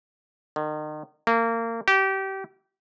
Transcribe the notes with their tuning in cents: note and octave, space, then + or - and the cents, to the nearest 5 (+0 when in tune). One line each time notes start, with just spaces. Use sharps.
D#3 -35
A#3 -25
G4 -25